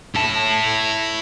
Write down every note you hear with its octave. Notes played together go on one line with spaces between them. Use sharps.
E4 A5